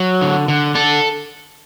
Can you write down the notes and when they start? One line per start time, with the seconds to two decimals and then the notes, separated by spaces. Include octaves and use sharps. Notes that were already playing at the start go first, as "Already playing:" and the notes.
Already playing: F#3
0.21 D3
0.48 D3
0.75 D3 A4